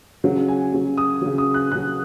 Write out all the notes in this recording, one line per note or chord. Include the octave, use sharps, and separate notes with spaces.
C#3 F#3
G#5
C#3 F#3
D#6
C#3 F#3
D#6
F#6
C#3 F#3 F#6